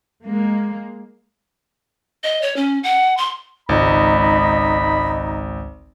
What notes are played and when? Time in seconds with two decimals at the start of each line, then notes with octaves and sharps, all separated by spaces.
0.25 G#3 A#3
2.24 D#5
2.42 C#5
2.56 C#4
2.83 F#5
3.17 C6
3.69 G#1 C#2 D#4 B5